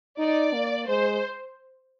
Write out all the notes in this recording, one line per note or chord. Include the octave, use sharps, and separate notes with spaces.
D#4 D5
A#3
G#3 C5